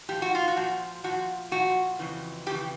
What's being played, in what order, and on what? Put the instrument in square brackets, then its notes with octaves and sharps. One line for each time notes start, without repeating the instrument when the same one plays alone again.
[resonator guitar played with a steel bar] A#2 F3 G4
F#4
F4
F#4
A#2 F3
A#2 F3 F#4
A#2 F3 F#4
F2 C#3 E3
F2 C#3 E3 G4